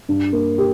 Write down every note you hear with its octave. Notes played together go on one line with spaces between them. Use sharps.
G2
A#3
G4